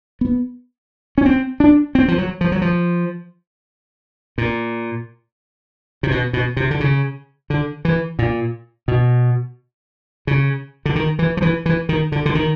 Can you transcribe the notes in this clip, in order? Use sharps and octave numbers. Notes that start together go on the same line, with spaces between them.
B3
C#4
C4
D4
C4
F3
F#3
F3
F#3
F3
A#2
C3
B2
B2
C3
D3
C#3
D3
E3
A#2
B2
C#3
D3
D#3
E3
F3
E3
E3
D#3
D3
D3
D#3